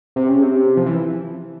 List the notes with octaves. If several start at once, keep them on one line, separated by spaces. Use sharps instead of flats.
C3
C#3
C3
F3
E3